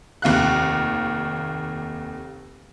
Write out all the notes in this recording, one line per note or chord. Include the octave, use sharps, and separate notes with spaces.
F1 D#2 F5 F#6